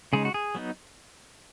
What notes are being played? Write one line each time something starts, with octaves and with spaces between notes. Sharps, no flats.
C#3 G#3 D#4 G#4
F#4
G#4
F#3 B3 D#4